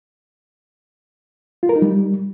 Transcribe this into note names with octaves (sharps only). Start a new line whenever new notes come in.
F4
A#4
D#4
G3